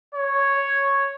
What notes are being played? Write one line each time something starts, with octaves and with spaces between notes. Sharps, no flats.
C#5